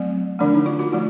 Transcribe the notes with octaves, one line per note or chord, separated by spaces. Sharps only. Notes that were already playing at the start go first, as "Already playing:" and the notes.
Already playing: F#3 A3 C4
D3 F3 A3 D4
D#4
F4
F#4
F3 A3 F4